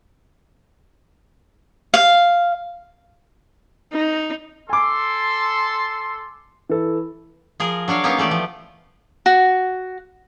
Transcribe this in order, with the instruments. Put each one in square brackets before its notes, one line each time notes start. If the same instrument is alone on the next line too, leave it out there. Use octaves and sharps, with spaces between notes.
[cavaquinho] F5
[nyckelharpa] D#4
[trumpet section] A4 C6 [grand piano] G#5 D6
[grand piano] E3 A4
[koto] F3 G#4 A#4
F#3 D4 C#5 F5
A#3 B3 C#4 D#4 C#5 F5
E3 A3 G4 D5
F3
[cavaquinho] F#4